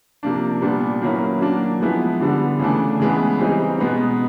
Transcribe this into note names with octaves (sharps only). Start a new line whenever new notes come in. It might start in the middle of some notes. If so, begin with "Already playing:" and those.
C3 F3 A#3 D4
A#2 G3 B3 D4
D#3 F#3 A#3 C#4 E4
F#3 A#3 D4
F3 G#3 B3 E4
D3 G3 B3 D4
C#3 E3 A3 D4
C#3 E3 G#3 B3
E3 G3 C4 D#4
B2 G#3 B3 D#4